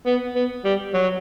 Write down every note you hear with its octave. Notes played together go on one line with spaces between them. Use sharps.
B3
B3
G3
F#3